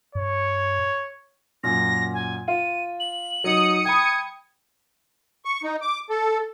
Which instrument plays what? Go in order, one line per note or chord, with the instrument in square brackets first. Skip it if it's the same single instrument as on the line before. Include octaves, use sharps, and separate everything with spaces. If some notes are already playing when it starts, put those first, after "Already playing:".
[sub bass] G2 [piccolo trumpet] C#5
[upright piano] F#2 A#2 [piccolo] A#6
[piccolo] G#5
[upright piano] F4 [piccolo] D#7
[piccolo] F#7
[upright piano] F#3 D#4 [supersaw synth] D#6 C#7
[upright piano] G5 B5 [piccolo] G#6
[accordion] C#6
D#4
D6
A4